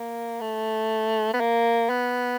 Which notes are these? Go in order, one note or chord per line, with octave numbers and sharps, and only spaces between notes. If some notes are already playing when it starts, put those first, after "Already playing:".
Already playing: A#3
A3
B3
A#3
B3